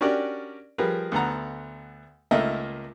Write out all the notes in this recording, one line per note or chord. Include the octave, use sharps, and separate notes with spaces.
C#4 D4 F#4 G4 A#4 D5
F3 G3 G#4 A#4 B4
D2 A3 B3 F#5 A#5
C#2 A3 A#3 A#4 D#5 E5